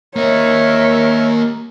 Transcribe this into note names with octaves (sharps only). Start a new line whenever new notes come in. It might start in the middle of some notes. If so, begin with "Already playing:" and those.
A#3 A#4 C#5 D#5 E5